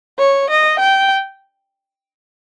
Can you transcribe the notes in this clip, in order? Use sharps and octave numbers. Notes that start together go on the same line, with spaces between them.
C#5
D#5
G5